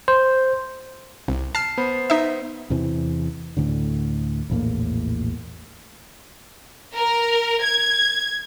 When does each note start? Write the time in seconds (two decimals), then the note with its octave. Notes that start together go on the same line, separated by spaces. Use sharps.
0.08 C5
1.28 C2
1.55 A5 F6 C7
1.77 B3 C5 B5
2.10 D#4 E5
2.70 E2 C3 E3
3.57 D2 A2 D3
4.49 A#1 E2 A2 A#3
6.96 A#4
7.63 G#6